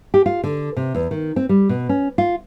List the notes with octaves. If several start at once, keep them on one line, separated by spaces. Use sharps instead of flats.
G4
F4
D3
C3
E2
D#3
C4
G3
B2
C#4
F4